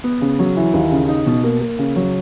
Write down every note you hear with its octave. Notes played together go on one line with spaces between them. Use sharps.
B3
C#3
F#3
E3
D#2
C#3
D#4
B2
A#3
A#3
C#3
F#3